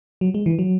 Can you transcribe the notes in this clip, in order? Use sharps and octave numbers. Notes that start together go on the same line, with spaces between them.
F#3
G#3
E3
F#3